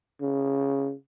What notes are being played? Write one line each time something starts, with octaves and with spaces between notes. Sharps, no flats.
C#3